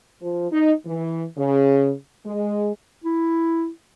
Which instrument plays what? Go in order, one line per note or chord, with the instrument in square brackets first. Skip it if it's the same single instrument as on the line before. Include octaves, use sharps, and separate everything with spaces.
[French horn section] F3
D#4
E3
C#3
G#3
[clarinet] E4